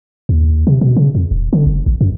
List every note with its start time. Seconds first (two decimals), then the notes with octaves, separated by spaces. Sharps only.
0.29 D#2
0.67 C3
0.81 B2
0.96 C#3
1.15 F2
1.31 D#1
1.53 D3
1.66 F#1
1.86 A1
2.01 F#2